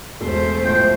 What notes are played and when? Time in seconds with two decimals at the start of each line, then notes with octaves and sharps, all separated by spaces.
0.21 E1 A3 C5
0.64 A2 F3 G5